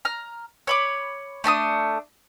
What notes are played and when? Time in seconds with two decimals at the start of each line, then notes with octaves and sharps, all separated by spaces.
0.05 A#5 F6
0.67 C#5 B5 D6
1.44 A3 D4 B5 D#6